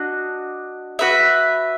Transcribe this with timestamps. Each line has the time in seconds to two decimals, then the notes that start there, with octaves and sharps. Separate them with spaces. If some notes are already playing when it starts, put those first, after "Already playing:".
Already playing: D4 F#4 D#5
0.99 F#4 B4 E5